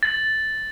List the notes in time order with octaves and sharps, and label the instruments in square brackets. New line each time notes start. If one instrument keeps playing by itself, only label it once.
[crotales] A6